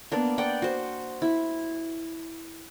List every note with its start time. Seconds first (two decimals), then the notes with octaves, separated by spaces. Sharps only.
0.12 A#3 B3 D4
0.38 D5 F#5 G5
0.62 F#4 C5
1.22 E4